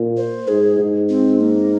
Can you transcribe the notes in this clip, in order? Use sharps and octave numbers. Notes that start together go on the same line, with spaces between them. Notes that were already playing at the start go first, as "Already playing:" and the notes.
Already playing: A#2
C5
G#2 G#4
G#2
C4
A#3